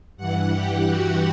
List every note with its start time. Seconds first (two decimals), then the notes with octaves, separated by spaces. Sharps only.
0.17 G2 E3 F#5
0.52 G4
0.87 F#4